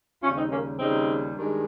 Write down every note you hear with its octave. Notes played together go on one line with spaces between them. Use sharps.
D#2 C#3 G3 C#4 F4
C4 D#4
A#3 C#4
D#2 C#3 G3 C4 D#4
G2 D#3 G#3